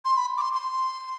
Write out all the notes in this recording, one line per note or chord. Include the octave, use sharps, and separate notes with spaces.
C6
B5
D6
C6
C6